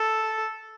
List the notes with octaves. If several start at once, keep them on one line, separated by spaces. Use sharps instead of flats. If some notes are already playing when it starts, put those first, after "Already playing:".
Already playing: A4